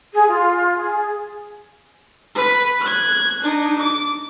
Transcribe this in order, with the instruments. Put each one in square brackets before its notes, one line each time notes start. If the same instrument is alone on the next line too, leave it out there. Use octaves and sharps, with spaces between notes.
[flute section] G#4
F4
G#4
[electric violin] B4 B5
F#6 G#6
D4 D#4
D6